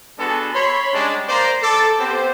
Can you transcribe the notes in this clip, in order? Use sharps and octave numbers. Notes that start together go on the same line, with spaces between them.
G#3 B3 D4 F#4 G#4 A4
C#5 B5 C6
G3 G#3 C#4 D4
A#3 C5 D5 A#5 C6
A4 D6
B3 C4 G4 C5